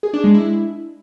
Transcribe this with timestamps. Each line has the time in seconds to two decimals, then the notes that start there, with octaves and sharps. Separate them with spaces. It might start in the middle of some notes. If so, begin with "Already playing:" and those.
0.03 G#4
0.14 D4
0.24 G#3
0.34 E4